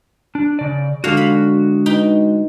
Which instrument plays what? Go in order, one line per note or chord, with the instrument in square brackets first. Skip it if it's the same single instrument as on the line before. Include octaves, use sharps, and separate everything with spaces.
[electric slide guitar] D4
C#3 D5
[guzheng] D3 F5 [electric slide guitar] G#3 F#4
[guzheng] F5 B5
D#4 B4 G5